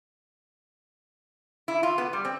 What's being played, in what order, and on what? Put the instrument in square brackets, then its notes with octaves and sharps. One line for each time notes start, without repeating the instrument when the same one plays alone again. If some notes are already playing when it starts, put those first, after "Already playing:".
[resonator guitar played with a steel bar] E4
F4
B3
G3
C4